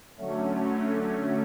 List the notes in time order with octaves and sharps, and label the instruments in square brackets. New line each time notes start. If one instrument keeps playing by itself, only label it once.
[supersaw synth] D3 F#3 A3 C#4